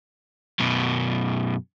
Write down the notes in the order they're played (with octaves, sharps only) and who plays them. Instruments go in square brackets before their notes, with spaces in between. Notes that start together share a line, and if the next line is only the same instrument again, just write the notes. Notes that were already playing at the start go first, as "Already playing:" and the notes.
[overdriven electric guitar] F#2 B2